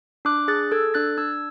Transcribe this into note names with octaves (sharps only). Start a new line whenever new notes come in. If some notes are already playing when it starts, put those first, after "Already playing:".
D4 D6 F#6
G#4 F#6 A6
A4 E6 G#6
D4 F#6 A6
D4 E6 G#6